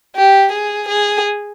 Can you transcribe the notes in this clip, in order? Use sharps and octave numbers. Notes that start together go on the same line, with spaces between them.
G4
G#4
G#4